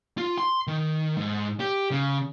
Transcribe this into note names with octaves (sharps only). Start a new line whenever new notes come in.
F4
C6
D#3
G#2
G4
C#3